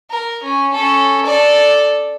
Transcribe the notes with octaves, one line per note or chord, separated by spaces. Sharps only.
A#4
C#4
C#4 A4
A4 D5